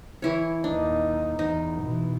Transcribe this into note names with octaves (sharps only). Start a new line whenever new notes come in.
E3 E4 C#5
D#2 D4 D#4
E2 D#4
B2 E3